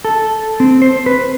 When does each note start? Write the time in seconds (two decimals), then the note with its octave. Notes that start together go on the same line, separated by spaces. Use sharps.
0.05 A4
0.60 C4
0.82 C5
1.06 B4